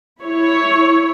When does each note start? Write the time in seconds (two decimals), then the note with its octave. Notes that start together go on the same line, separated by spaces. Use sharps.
0.21 E4 C#5